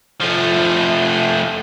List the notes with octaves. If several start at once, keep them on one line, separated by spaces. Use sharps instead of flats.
F3 A3